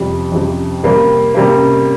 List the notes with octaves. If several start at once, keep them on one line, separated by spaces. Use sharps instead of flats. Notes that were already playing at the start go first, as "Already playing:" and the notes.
Already playing: F2 C3 G3
F2 C3 G3
C3 G3 A#3
C3 G3 A#3